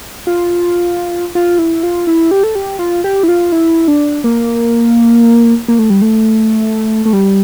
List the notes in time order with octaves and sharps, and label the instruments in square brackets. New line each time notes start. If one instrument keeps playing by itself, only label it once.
[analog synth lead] F4
F4
E4
F4
E4
G4
A4
G4
F4
G4
E4
F4
E4
D4
A#3
A#3
A3
G3
A3
A3
G3